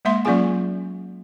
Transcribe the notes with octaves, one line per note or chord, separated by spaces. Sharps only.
G#3 A#3 E5 C6
F#3 A#3 C#4 F4 G#4 G#5